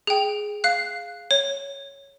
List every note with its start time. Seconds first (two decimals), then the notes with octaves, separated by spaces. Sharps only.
0.07 G#4 G5
0.64 F5 F#6
1.31 C#5